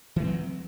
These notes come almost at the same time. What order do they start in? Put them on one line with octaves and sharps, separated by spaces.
E3 A3 C4 F#3